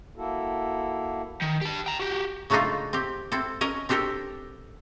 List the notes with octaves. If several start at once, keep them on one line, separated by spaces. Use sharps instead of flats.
A#3 E4 F#4 A4
D#3
G4 A5
G5 A#5
F#4 G4
C#3 F#3 A3 D4 D#4 F4
C4 G4
C4 E4 A4
C#4 A#4 D#5
C4 D4 G4 A4 A#4